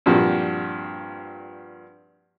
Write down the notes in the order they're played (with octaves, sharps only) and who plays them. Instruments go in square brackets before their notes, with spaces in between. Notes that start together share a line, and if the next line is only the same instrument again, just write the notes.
[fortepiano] G2 A#2 F3 C4 F#4 G4